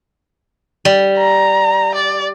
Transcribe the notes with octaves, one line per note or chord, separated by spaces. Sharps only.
G3
A#5
D5